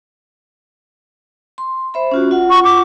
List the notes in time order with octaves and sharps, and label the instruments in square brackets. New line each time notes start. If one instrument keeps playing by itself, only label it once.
[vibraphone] C6
C5 E5 B5
C#4 F4 F#4
F4 F#5
[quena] C#6
D6